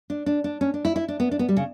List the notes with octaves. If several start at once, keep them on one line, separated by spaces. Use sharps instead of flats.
D4
D4
D4
C#4
D4
E4
E4
D4
B3
D4
B3
G3
C#3